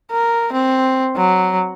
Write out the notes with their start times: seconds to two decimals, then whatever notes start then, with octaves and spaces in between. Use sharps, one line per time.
0.11 A#4
0.53 C4
1.16 F#3